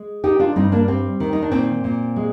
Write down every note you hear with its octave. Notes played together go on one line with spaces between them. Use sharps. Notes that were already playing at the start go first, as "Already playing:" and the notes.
Already playing: G#3
D#3 D#4 G4
D4 F4
G2 C4 D#4
A#3 D4
G3 C4
D#3
D#4
D4
A#2 C4
A#2
G#3